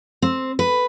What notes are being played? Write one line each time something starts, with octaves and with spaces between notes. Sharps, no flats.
C4
B4